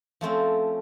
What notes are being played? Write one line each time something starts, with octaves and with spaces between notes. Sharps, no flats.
F3 A3 C4 C#4